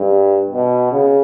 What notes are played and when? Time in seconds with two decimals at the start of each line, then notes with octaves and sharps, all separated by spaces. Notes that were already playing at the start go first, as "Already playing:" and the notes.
Already playing: G2
0.51 B2
0.92 C#3